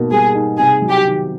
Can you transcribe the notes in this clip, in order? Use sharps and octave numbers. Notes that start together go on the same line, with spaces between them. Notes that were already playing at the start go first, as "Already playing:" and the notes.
Already playing: B2 A#3 D#4
G3 G#4
D#4
C3 G#4
F#3
G4
D#3